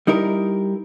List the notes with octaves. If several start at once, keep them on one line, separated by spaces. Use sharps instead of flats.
G3 D#4 E4 A#4